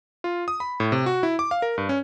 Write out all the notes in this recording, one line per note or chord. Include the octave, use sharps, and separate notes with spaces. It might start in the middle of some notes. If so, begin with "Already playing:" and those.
F4
D#6
B5
A2
C3
F#4
E4
D6
F5
A#4
G2
C#4